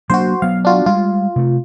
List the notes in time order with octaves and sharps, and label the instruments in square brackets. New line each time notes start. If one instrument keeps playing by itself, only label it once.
[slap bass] F#3 A#3 D4 [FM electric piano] F#4 C5
[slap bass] F#3 B3 [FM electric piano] F5
[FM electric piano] D4 F4 F#4
[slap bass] G3 G#3 [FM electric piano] F4
[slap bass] C3 A3